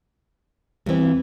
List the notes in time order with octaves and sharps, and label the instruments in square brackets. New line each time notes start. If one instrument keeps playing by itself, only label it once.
[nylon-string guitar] E2 E3 [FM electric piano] G3 C4